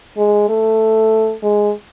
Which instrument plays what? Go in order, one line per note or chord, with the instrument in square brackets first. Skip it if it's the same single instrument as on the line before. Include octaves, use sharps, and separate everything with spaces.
[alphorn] G#3
A3
G#3